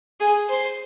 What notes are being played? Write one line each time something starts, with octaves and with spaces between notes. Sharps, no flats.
G#4
C5